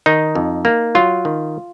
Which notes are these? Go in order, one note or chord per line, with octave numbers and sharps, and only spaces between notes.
D#3 D#4
F2
A#3
F#3 F4
D#3